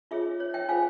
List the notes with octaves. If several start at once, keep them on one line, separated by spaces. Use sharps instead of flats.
F4 G#4 C#5 E5
C#5
E5 G5
F4 G#4 C5 F5 G#5